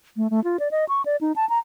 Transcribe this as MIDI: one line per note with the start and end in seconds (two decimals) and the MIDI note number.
0.17 0.30 57
0.30 0.43 57
0.44 0.57 65
0.60 0.71 74
0.71 0.85 75
0.89 1.02 85
1.06 1.16 74
1.21 1.32 63
1.36 1.48 81
1.49 1.59 82